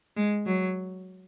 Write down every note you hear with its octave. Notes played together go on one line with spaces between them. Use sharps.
G#3
F#3